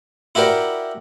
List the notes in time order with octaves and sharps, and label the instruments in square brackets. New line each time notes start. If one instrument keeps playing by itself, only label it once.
[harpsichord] E4 F#4 G4 A#4 D5